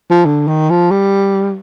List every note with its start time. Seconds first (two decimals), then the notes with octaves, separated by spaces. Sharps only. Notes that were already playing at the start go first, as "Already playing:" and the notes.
0.10 F3
0.25 D3
0.47 D#3
0.70 F3
0.91 G3